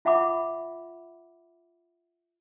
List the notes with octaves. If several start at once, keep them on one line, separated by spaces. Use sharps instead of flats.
F4 E5 F#5 B5 D6